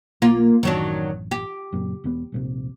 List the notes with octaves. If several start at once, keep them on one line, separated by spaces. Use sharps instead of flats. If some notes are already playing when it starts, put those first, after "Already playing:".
B1 A#3 F4
A1 F#2 D#3 F#3 D4
G4
F#1 F#2 A#2
E1 A#2 B3
D#1 A#1 C3